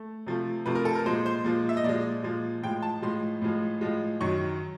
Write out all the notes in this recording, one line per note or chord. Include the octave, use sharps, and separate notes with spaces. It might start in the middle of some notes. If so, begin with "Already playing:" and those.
Already playing: A3
C3 F3 A3
C3 F3 A3 B4
A#4
A4
A#4
A#2 F3 G#3 C5
C5
A#2 F3 G#3
E5
D#5
A#2 F3 G#3 D5
A#2 F3 G#3
A2 F3 G#3 G5
A5
A2 F3 G#3 C6
A2 F3 G#3
A2 F3 G#3
F#2 D#3 F#3 C#6